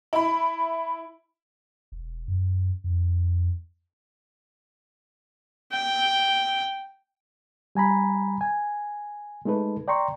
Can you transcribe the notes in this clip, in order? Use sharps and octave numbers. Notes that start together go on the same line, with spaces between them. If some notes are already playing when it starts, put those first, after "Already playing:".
E4 B5
E1
F#2
F2
G5
G3 G#5 A#5 B5
G#5
G#3 A3 D#4 A4 B4
D5 G5 A#5 C6 C#6